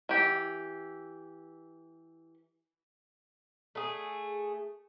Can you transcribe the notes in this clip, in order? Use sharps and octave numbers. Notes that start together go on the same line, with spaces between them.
E3 G4
A3 G#4